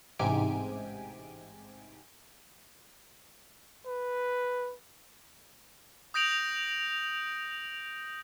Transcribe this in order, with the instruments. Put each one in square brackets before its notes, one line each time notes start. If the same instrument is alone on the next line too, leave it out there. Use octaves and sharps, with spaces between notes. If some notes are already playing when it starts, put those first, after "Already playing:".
[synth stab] A1 G#2 C3 G4 G#5 D7
[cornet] B4
[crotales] D#6 G6 A#6 D7 F7 F#7